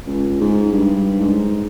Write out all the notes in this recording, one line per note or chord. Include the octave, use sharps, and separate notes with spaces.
C#2
G#2
G2
G#2